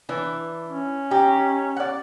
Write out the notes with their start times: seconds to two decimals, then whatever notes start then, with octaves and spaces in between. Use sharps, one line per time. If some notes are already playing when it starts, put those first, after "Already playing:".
0.09 E3 D4
0.68 C#4
1.11 D#4 G4
1.76 D5 F#5